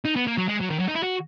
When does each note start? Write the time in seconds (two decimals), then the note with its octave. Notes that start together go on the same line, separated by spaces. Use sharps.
0.05 D#4
0.16 B3
0.27 A#3
0.38 F#3
0.48 G#3
0.60 F#3
0.70 D#3
0.79 F#3
0.88 D#4
0.95 E4
1.03 F#4